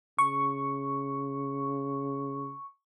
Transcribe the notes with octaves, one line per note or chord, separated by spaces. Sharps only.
C#3 C#6